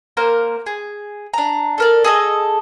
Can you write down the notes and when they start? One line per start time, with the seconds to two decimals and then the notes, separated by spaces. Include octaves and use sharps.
0.17 A#3 A#4 C5
0.66 G#4
1.34 D4 A#5
1.78 A4 A#4 D5
2.04 G#4 A4 D#5